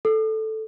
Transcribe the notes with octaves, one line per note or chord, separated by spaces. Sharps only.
A4